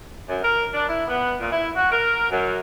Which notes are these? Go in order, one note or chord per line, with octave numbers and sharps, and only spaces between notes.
F#2
A#4
D4
E4
B3
A#2
E4
F#4
A#4
F#2